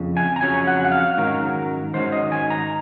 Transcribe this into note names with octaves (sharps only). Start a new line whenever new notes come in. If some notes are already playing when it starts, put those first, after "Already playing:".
Already playing: F2 C#3
G#5
A#5
F2 C#3 F#3 C#4 G#5
F#5
F#5
F5
G#2 D#3 F#3 C#4 A#4
G#2 D#3 F#3 C#4 C5
D#5
G#5
A#5